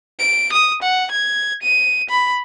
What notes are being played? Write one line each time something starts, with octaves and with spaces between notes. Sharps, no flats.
D7
D#6
F#5
G#6
D#7
B5